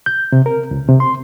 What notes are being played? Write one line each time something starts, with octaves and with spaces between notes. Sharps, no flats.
G6
C3
A#4
C#2
C3
C6